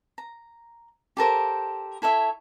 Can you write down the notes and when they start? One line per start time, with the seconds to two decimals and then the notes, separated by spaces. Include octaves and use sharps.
0.18 A#5
1.17 G4 A4 A#4 C5
2.02 E4 A4 C#5 E5